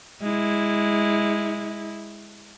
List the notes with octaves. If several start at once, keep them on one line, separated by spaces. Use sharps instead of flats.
G#3 E4